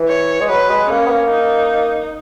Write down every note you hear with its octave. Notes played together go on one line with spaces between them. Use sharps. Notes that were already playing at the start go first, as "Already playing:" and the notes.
Already playing: E3
C#5
G#3
F#3 B4
G#3
A#3 C#4
B3
A#3
D#4